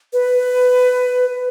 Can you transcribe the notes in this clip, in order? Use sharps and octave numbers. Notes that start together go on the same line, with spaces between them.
B4